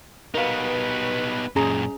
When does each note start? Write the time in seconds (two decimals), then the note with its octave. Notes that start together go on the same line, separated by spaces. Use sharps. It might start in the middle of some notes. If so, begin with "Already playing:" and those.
0.34 G3 B3 D#4 F#4 A#4 B4 F5
1.56 F#2 A#2 C#4 G#4 A#5